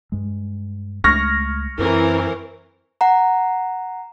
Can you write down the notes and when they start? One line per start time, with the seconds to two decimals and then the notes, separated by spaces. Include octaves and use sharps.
0.12 G2 G#3
1.04 C#2 G#3 A3 C#6 F6 A#6
1.79 F#2 E3 C4 A#4
3.01 F#5 A#5